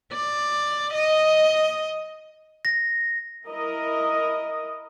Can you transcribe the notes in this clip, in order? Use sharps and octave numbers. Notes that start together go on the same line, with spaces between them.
D5
D#5
A#6
E4 A#4 D#5